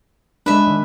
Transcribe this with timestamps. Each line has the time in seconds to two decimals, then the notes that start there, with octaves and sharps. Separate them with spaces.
0.46 G#3 D4 B4 E5
0.67 D#3